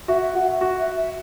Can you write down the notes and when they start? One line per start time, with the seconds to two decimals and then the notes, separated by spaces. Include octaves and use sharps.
0.08 F#4 E5
0.22 E5
0.35 F#4 F#5
0.48 E5
0.61 F#4
0.79 E5
0.97 E5